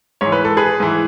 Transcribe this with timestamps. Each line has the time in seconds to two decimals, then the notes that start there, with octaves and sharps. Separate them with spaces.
0.21 G#2 E3 C#5
0.32 B4
0.45 A4
0.57 G#4 B4
0.80 G#2 E3